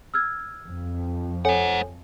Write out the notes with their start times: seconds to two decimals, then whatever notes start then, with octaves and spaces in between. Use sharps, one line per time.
0.14 E6 F6 G#6
0.66 F2
1.45 A4 C5 C#5 F#5 G#5